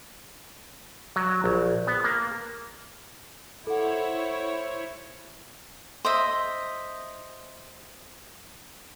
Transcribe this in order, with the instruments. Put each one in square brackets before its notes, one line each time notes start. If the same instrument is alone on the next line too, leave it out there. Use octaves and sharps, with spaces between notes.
[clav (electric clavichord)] F#3
A#1
B3
A#3
[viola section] E4 C5 C#5 [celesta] A4 F#5
[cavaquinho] C5 D#5 E5